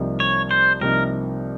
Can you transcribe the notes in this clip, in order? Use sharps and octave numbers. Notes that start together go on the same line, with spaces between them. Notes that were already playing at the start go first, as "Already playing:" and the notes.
Already playing: C2 C3 F3 A#3 D#4
C#5
C5
C2 C3 F3 A#3 D#4 A#4